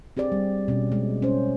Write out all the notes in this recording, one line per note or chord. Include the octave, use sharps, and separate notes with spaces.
C4 G4 G#4 D5
G3
B2 C#4
G#3
C#4 C5